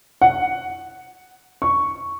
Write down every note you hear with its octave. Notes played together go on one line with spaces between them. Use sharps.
F#5
C#6